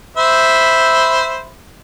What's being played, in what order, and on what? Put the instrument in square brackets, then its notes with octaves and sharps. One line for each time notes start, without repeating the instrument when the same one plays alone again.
[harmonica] C5 E5 B5